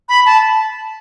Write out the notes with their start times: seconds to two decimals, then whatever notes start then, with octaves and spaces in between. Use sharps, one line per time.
0.09 B5
0.26 A5